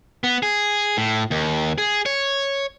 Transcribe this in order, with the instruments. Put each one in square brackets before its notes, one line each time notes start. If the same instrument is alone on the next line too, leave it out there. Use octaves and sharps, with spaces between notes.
[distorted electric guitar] B3
G#4
A2
D#2
G#4
C#5